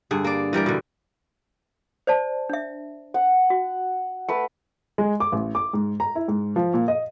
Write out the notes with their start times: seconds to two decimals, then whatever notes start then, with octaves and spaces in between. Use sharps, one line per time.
0.11 G2 D3 G#4
0.24 A#3 D5
0.53 E3 G3 A#4 D5
0.66 B2 D3
2.07 C5 D5 A5
2.50 D4 E5
3.14 F#5
3.50 F#4
4.29 A3 B4 G5
4.98 G#3
5.20 D6
5.32 A1
5.55 D6
5.73 G#2
6.00 A#5
6.15 E4
6.28 G#2
6.56 F3
6.74 A#2
6.88 D#5